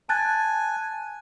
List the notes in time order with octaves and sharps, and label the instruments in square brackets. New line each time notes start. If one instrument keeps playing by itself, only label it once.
[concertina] G#5 [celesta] A5 F#6 A6